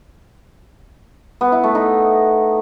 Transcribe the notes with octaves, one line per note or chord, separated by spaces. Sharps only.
B3
E4
A3
D#4